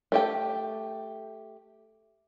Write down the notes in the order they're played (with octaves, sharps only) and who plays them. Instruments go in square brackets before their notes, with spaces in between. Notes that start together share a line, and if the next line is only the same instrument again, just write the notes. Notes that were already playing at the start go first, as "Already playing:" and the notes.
[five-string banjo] A3 G4 G5